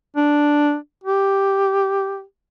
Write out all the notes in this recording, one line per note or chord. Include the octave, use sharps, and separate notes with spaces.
D4
G4